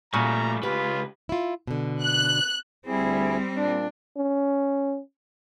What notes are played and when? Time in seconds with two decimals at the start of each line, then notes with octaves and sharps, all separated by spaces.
0.14 A#2 C#3 G3 A3 F#4 G#5 A#5
0.63 C#2 F4 G4 B4
1.29 E4 F4
1.67 B2 D3
2.02 F#6
2.86 D2 G3 C4 E4 G#4
3.56 A#2 D4
4.17 C#4